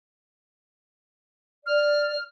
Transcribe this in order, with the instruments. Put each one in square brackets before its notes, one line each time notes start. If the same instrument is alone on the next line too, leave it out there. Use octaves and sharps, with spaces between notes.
[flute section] D5 [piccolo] F6